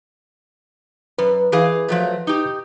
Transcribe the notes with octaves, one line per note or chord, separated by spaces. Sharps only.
F#2 B4
E3 G#4 F5
F3 F#3 A3
D#4 G4